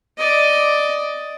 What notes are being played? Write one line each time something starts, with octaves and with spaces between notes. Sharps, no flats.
D5 D#5